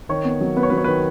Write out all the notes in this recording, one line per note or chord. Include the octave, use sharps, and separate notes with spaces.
D#3 C#5
B3
F#3
B3 B4
C#5
F#3 B4
C#5
D#3 B4